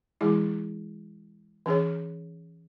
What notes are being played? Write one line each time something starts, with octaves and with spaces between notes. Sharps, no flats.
E3 G#3 E4 G#4
E3 C#4 G#4 C#5